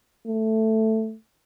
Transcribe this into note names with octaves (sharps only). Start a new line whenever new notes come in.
A3